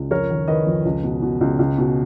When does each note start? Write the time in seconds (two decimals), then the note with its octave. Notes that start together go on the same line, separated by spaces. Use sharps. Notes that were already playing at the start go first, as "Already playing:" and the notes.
Already playing: C#2
0.11 F2 A#4 C#5
0.30 D#3
0.48 D#3 B4 D#5
0.67 F2
0.85 C#2
1.04 B2
1.22 B2
1.41 C#2
1.59 C#2
1.78 B2